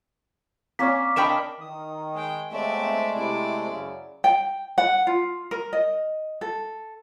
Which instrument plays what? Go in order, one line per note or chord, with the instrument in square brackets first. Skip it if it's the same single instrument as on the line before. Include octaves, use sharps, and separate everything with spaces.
[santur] A#3 C#4 [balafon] C4 C#5 D5 [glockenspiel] D6 B6
[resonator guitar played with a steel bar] D4 A#4 G5 [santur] D#5 B5 C#6 [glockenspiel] E7
[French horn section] D#3 [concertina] D#6
[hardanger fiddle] G#3 G5
[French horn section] D#2 C4 [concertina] G#3 A3 [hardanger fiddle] D5 E5
[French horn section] C3 [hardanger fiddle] E4 D5
[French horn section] F#2 C#3
[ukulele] G5
F#5
F4
A#4
D#5
A4